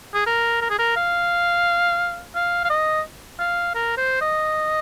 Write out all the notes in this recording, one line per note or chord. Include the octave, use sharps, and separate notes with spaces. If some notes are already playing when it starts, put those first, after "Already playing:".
G#4
A#4
A#4
G#4
A#4
F5
F5
F5
D#5
F5
A#4
C5
D#5